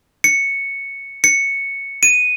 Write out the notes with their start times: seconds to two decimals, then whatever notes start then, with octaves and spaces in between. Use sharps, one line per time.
0.24 C#7
1.24 C#7
2.03 D#7